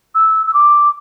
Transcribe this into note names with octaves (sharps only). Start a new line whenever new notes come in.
E6
E6
D6